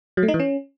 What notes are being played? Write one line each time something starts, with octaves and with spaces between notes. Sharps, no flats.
F#3
A3
D#4
E3
C#4